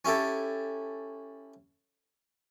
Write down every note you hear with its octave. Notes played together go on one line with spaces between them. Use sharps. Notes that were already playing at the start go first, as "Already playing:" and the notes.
C#4 E4 G4 A4